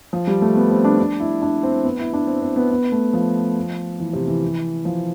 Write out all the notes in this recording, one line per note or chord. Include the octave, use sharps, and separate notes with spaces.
F3
G3
A3
B3
C4
D4
D4
E4
D4
C4
B3
E4
D4
C4
C4
B3
B3
A3
F3
E3
C3
E3
F3